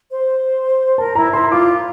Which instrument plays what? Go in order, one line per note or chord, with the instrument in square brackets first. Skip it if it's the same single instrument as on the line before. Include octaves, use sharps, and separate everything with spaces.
[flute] C5
[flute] A#4 [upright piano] A5
[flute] E4 [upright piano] A#5
[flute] E4 [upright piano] C6
[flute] F4 [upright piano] D6